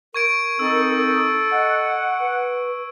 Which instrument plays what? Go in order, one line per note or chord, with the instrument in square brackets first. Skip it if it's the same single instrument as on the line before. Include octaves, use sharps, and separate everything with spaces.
[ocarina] A#4 [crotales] C#6 G#6 D7
[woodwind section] C4 D#4 [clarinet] A4 [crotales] E6
[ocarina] D#5 [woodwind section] F#5
[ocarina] B4